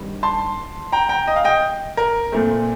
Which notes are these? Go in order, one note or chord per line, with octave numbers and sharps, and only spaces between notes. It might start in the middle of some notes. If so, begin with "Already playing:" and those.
Already playing: G2 D#3 G3 C4
A5 C6
G5 A#5
G5 A#5
D#5
F5
D#5 G5
A#4
A#2 A3 C4